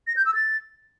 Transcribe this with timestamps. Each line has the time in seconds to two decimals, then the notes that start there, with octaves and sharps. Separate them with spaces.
0.07 A#6
0.16 G6
0.26 E6
0.35 A6